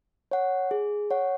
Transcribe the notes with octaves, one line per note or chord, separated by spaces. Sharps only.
C#5 F#5
G#4
C#5 F#5